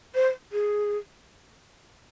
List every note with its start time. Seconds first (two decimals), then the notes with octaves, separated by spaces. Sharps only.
0.15 C5
0.52 G#4